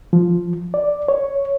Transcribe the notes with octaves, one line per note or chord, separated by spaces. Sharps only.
F3
D5
C#5